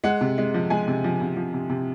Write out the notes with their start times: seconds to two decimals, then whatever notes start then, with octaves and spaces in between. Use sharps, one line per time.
0.04 G#3 F#5
0.21 C3
0.38 G#3
0.54 F3
0.70 G#3 G#5
0.87 C3
1.04 F3
1.21 C3
1.36 F3
1.54 C3
1.69 C3